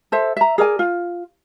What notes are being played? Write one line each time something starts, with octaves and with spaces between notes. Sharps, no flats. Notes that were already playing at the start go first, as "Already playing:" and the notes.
A4 C5 E5
E5 A#5
G#4 A#4 D5 G#5
F4